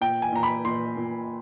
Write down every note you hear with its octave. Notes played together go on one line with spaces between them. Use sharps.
A#2 G5
G#5
A#2 A#5
B5
A#2 C6
A#2